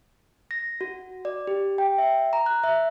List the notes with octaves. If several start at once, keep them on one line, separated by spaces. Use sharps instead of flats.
A#6
F#4
D5
G4
G5
E5
A#5
F#6
E5